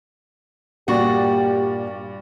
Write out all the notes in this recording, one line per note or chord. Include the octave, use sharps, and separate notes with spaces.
G2 A#2 F#4 G4 D5 C#6